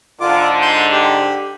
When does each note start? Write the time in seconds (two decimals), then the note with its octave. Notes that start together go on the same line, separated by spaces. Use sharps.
0.20 G#2 D3 F4 D6
0.62 C6 G6
0.92 G4